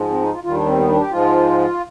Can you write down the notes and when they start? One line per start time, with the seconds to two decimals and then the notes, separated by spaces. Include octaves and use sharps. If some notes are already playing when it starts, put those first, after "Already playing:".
Already playing: G#2 F3 G#3
0.10 C4
0.21 D#4
0.33 F4
0.44 D#2 D#3 G3 F4
0.55 D4
0.66 C4
0.77 B3
0.89 D4
0.99 G4
1.11 G#2 F3 G#3 F4